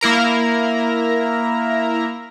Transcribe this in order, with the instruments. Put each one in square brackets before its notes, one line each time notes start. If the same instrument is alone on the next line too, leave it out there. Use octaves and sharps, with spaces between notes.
[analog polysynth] A#3 E4 A#4 A#5